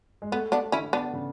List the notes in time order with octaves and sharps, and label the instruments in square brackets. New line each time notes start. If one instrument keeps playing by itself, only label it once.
[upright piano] G#3
[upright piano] A3 [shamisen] B3
[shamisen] B3 D4
[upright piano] D3 [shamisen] C#4 E4
[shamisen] B3 D4
[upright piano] C#3